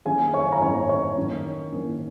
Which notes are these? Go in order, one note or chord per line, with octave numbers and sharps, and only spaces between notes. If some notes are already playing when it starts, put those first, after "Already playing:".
D#3 A#3 C#4 G#4 G#5
C#5 C#6
G#5
A#5
D#3 A#3 C#4 C#5 C#6
C#5 C#6
D#3 A#3 C#4
D#3 A#3 C#4